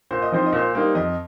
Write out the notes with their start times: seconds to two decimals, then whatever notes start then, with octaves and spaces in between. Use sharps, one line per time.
0.11 A#2 C5
0.22 D#5
0.32 F3 C4 D#4 C5
0.46 D#5
0.53 A#2 C5
0.75 G3 A#3 D#4
0.95 F2 D#5